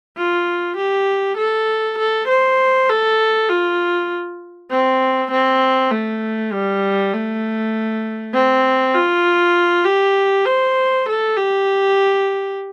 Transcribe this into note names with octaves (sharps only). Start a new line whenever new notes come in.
F4
G4
A4
A4
C5
A4
F4
C4
C4
A3
G3
A3
C4
F4
G4
C5
A4
G4